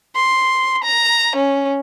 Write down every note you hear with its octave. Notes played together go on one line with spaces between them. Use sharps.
C6
A#5
C#4